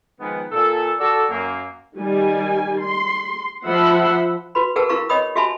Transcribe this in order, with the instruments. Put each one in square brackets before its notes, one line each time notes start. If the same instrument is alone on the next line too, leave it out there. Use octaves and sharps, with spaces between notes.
[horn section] D#3 F3 G#3 B3
A#2 A4
F#4 A4 D5
F#2 A#3
[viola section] D#3 G3 G#5
C6
F3 E5 F#5 B5 C6
[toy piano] F#4 B4 B5
G#4 A#4 B4 F#5 G5 A5
E4 A#4 F5 A#5 C#6
C#5 D#5 G5 B5 D#6
F#4 G4 E5 G#5 A5 B5